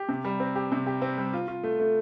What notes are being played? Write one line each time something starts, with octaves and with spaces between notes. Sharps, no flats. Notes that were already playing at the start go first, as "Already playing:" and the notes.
Already playing: G4
C3
G3
C4
G4
C3
G4
C4
G3
F4
F4
A3
A3